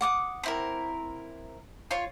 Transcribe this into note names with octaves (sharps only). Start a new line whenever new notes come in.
F#5 D6 D#6
C4 E4 A#4
F4 C#5